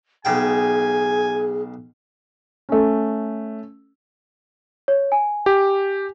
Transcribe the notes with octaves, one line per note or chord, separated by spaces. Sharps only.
B1 C#3 G#4 G5 G#5
A3 C#4
C#5
G#5
G4